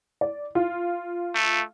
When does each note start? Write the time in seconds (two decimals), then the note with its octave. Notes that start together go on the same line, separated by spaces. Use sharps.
0.21 D5
0.55 F4
1.35 A3